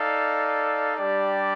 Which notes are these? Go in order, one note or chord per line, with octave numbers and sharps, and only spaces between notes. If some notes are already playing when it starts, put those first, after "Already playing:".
Already playing: D#4 A4 D5 F5
G3 D4 G4 D5